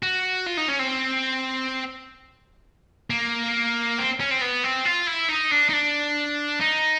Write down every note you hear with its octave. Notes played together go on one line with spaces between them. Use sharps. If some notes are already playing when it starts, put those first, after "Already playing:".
F#4
F4
D#4
C#4
C4
A#3
C4
C#4
C4
B3
C4
F4
E4
D#4
D4
D#4
D4
D#4